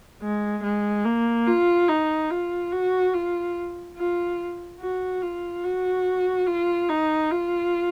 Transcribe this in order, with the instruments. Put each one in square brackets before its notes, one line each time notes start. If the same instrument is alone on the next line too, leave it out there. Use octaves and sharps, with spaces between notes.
[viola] G#3
G#3
A#3
F4
D#4
F4
F#4
F4
F4
F#4
F4
F#4
F4
D#4
F4